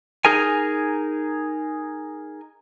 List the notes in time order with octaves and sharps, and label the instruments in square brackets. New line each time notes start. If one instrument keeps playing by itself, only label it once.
[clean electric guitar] D#4 G#4 A#4 G#5